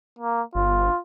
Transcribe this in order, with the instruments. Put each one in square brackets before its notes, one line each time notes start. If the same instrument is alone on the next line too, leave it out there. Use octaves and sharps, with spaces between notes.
[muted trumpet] A#3
[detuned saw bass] G1 [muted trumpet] F4